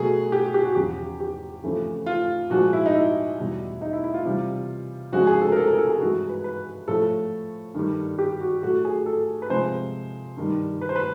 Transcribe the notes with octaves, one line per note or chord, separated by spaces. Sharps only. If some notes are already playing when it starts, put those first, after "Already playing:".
Already playing: B2 F#3 A3 G#4
G4
G4
F#4
E2 C#3 F3 G4
G4
F2 C#3 E3 A3
F4
A#2 F3 G#3 F#4
E4
D#4
E4
E2 B2 G3
D#4
E4
E4
F4
C3 E3 G3
F2 C#3 F3 G#3 F#4
G#4
A4
A#4
A4
A#4
A4
G#4
G2 E3 G#3 F#4
B4
B4
A2 F3 A3 A4
G2 D#3 G3
G4
F#4
A2 F#3 A3 F#4
G#4
A4
B4
C3 F3 G#3 C5
G2 D#3 G3
B4
C5
B4